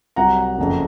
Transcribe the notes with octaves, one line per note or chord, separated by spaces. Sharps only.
C2 C3 F#3 F#5 A#5
F#1 F2 C#3